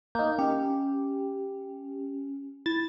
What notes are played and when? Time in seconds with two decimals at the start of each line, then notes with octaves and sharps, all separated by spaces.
0.15 A#3 D#4 G6
0.39 C#4 G4
2.66 E4 A6